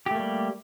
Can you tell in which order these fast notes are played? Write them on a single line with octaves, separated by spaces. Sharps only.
G4 A3 A#3 G3